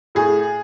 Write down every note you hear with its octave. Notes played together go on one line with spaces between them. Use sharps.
A2 G#4